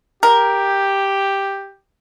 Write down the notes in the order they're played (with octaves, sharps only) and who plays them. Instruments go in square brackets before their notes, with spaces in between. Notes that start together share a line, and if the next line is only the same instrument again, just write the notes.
[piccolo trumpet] G4 [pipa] A#4